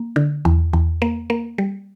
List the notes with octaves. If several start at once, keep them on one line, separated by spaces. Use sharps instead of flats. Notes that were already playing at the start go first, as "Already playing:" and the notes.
Already playing: A#3
D3
E2
E2
A#3
A#3
G3